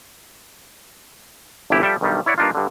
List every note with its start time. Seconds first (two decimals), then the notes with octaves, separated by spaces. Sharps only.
1.70 G1 C2 G2 E3 E4 G4
1.82 F3 G3 A4 E5 G5
2.01 B1 G2 D#3 G3
2.26 E4 C#5 D5 F#5
2.38 G2 A#3 D4 D#4 F4
2.55 G2 D3